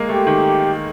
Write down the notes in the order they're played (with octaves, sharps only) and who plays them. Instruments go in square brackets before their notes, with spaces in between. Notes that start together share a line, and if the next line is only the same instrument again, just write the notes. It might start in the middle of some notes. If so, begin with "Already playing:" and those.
Already playing: [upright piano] G#3 A#3
[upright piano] A3 [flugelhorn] G4
[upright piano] D#3